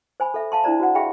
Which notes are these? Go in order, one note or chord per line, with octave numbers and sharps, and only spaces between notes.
C5 G#5 B5
A4 E5
E5 F5 A5 C6
D4 E4 F4 C5 D5 A#5
F#4 C5 F#5
G4 G#4 E5 F5 G5 B5